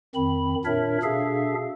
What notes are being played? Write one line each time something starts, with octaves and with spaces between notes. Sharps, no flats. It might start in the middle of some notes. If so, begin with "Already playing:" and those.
F2 D#3 C4 B5
A#2 D4 A#4 C#5 E5
B2 D4 G#4 A4 E5 F5